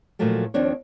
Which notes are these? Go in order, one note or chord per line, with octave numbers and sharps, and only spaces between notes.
A#2 D#3 F3 F#3 A3 A#3
D#2 D#3 F3 C4 D4 C#5